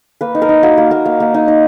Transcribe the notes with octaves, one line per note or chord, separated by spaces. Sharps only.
A#3 B4
D#4
A#4
D#4
A#3 F#4
A#3
A#3
A#3
A#3
D#4
D#4